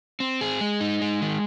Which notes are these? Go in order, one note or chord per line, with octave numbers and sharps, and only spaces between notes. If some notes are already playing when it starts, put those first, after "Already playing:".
C4
G#4
G#3
D#4
G#3
D#3